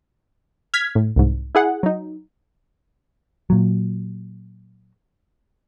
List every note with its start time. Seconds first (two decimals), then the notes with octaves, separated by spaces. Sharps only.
0.74 F6 G#6 B6
0.95 A2
1.16 C2 G#2
1.55 E4 G#4 F#5
1.83 F#3 D#4
3.50 A#2 F#3